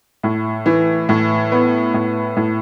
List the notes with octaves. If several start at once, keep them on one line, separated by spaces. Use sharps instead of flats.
A2
E3
A2
B3
A2
A2